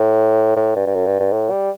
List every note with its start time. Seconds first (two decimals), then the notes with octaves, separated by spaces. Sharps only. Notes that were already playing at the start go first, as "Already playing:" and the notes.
Already playing: A2
0.56 A2
0.76 G2
0.86 G2
0.94 F#2
1.06 G2
1.20 G2
1.32 A2
1.50 G3